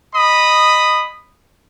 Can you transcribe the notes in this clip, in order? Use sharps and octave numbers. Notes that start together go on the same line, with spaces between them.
D#5 B5 D#6